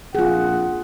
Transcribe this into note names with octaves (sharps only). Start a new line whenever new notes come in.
A#1 F2 F4 G#4 F#5